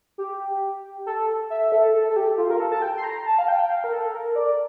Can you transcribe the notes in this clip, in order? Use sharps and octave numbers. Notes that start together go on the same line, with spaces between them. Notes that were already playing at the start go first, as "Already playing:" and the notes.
G4
A4
E5
A4
A4
A4
G4
F4
A#4
A4
A5
G5
C6
A#5
A5
F5
G5
F5
A#4
A4
A#4
D5